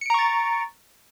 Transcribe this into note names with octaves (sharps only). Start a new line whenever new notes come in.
A#5 C#6 A6 C#7 D7